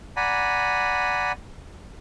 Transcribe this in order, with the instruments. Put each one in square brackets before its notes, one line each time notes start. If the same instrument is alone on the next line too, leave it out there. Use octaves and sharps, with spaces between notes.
[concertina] D5 F#5 G#5 A#5 B5